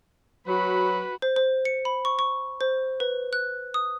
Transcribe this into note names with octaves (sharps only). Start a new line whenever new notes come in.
F#3 F#4 B4 B5
C5
C5
C#7
B5
C#6
C#6
C5
B4
F#6
D#6